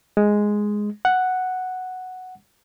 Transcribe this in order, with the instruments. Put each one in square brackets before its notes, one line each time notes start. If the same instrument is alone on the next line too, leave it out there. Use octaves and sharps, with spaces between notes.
[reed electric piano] G#3
F#5